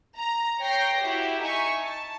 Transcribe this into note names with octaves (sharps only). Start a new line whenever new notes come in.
A#5
C#5 G5 A#6 C7
E4 F#4 G4
D#4 E5 G#5 C#6
A5